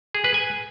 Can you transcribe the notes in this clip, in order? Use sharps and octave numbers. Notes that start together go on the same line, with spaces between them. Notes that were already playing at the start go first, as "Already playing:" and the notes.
G#4
B4
G#5